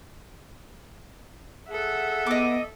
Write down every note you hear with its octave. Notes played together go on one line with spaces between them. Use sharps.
G#4 A4 E5 F#5
B3 D#5 D6